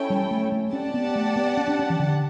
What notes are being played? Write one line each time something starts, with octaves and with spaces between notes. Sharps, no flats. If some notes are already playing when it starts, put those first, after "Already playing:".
Already playing: C#4 E4 A4 C#5 G5
G3
A3
A3
C#4 G4 D5 F#5 A5
B3
A3
B3
C#4
D4
C#4
E3
D3